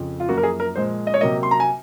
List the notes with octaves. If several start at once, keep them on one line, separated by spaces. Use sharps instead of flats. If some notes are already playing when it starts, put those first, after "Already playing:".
Already playing: F2 C#3 F3
F4
F#2 F3 A#3 F#4
A#4
G#4
A#4
A#2 F3 G#3 C5
D#5
C#5
C3 F#3 A#3 D#5
C6
A#5
G#5